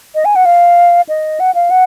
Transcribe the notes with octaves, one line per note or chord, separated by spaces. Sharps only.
D#5
G#5
F#5
F5
D#5
F#5
F5
F#5